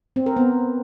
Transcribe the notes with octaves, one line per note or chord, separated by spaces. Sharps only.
C4
A#4
B3